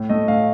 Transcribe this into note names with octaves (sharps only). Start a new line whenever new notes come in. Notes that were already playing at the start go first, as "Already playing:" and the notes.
Already playing: A2
A3 D#5
A2 F5